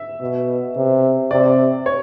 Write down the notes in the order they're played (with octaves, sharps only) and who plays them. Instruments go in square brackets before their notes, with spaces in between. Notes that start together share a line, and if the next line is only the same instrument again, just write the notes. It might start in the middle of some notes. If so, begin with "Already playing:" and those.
Already playing: [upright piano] E5
[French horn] B2
C3
[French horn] C3 [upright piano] D5
[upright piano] C#5